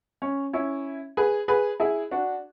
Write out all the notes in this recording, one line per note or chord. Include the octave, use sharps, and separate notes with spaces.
C#4
C#4 E4
G#4 B4
G#4 B4
E4 G#4
D4 F#4